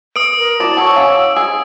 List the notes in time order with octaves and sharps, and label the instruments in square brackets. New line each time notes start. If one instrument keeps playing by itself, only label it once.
[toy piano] B4 [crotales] D#6 D7
[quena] A#4
[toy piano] E4 F#4 [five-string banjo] D5 [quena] A5
[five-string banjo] A4 C#5 [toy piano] F#5 C#6 [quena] E6
[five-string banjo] C#4 [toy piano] F5 F#5 D6
[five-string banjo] G#4